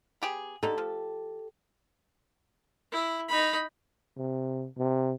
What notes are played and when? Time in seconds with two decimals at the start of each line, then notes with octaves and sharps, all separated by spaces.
0.22 B3 G4 G#4
0.63 D3 D#4 G4 A4
0.78 F3
2.92 E4
3.28 D#4 B5
4.17 C3
4.78 C3